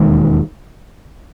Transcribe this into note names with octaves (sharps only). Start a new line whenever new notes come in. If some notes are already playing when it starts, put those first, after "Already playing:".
Already playing: E1 D#2 D#3 G#3